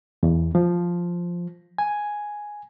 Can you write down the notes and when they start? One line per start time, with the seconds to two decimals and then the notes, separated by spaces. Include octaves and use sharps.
0.23 E2
0.55 F3
1.78 G#5